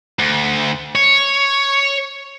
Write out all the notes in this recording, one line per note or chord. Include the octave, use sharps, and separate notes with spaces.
D2
C#5